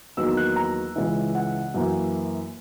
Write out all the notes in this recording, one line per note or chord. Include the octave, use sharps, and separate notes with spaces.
E2 D#3 F#3 A#3 E6
F#6
A#5
C#2 C#3 E3
F#5
F#2 E3 A#3